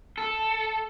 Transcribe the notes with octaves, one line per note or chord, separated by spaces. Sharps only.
A4